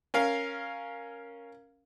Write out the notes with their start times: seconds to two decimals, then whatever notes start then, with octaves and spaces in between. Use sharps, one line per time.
0.14 C#4 A#4 F5